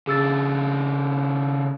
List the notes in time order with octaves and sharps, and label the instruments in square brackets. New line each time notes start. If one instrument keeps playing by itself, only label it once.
[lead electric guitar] C#3 D4 [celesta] G#4 E6 A6